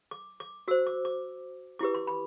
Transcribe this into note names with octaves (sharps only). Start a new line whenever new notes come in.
D6
D6
F#4 C5 E6
D6
D6
E4 G4 B4 D6
C6
B5